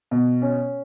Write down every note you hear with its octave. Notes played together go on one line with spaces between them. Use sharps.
B2
C#4